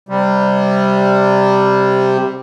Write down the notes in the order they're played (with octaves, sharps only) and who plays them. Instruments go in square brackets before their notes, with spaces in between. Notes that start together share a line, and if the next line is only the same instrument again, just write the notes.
[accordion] C3 G3